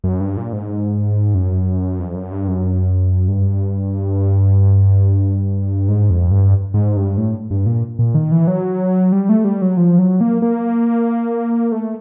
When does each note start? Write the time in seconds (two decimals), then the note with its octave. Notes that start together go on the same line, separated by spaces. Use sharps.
0.04 F#2
0.20 G2
0.37 A#2
0.53 G#2
1.35 F#2
1.99 F2
2.15 F#2
2.32 G2
2.48 F#2
3.28 G2
5.88 G#2
6.10 F2
6.31 G2
6.74 G#2
6.97 G2
7.18 A2
7.51 G2
7.66 A#2
7.99 A#2
8.14 D#3
8.32 E3
8.47 F#3
9.12 G3
9.29 A3
9.45 G3
9.62 F#3
9.77 F3
9.99 F#3
10.21 A#3
10.42 A#3
11.72 A3